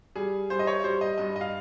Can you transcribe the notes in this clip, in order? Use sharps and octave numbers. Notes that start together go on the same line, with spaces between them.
G3 G#4
G3 C5
D#5
C#5
G3 C5
D#5
G2 D#5
D#5
F5